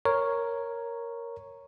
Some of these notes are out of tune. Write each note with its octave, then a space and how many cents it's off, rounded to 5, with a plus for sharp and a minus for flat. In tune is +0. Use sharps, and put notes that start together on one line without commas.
A#4 +0 C#5 +0